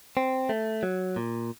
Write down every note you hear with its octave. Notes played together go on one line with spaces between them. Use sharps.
C4
A3
F#3
A#2